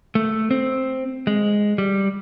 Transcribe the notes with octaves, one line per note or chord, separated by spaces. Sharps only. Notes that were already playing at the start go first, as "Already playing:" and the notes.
A3
C4
G#3
G3